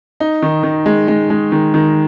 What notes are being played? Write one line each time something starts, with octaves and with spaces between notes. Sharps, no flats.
D#4
D#3
D#3
G#3
G#3
G#3
D#3
D#3